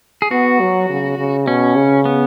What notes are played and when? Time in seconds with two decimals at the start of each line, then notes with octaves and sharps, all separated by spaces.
0.22 G#4
0.31 B3 F#4
0.60 F#3
0.89 C#3
1.18 C#3
1.47 B2 C#4
1.76 C#3
2.05 B3